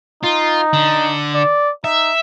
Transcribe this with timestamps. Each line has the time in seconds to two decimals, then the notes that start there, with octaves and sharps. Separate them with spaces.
0.24 D#4 F4
0.73 D3
1.34 D5
1.84 D#4 E5